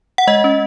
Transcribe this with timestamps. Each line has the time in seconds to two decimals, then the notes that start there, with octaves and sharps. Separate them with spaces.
0.18 F#5
0.27 G#3 D#5
0.44 C#4